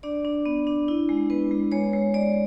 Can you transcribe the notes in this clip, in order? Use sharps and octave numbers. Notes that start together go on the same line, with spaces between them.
D4 D5
D4
B3
D4
E4
G#3
B3 B4
G#3
G#3 C#5
G#3
G#3 D5